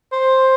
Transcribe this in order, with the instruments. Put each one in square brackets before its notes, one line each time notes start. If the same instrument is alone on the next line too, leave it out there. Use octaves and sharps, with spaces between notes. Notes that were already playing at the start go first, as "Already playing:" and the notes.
[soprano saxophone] C5